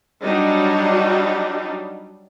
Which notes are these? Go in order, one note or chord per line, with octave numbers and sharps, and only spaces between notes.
F#3 G3 D4 D#4